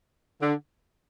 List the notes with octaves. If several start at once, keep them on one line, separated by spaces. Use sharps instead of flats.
D3